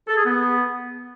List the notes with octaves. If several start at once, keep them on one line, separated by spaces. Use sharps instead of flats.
A4
G#4
B3